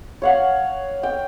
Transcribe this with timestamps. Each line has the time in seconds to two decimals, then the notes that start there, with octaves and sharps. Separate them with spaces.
0.22 C#5 F5 F#5
1.03 G5